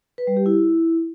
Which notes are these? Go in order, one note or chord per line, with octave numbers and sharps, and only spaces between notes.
B4
G3
G4
E4